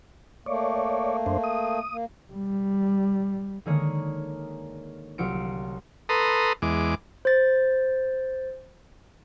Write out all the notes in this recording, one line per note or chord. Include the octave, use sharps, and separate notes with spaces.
A3 A#3 C#5 D5
F#2 D4 C5
D#6
A#3
G3
D3 D#3 G#3 A#3 G#4 C#5
C2 F#3 F4 C#7 D7
A4 B4 A#5 C6 D#6
E2 G#3 D6
C5 A6